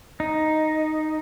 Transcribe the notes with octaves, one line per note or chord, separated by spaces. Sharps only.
D#4